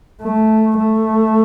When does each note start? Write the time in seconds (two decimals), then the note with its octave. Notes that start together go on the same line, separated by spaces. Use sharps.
0.22 A3
0.77 A3